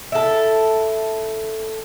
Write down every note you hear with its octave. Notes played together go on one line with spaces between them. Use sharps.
E4 A4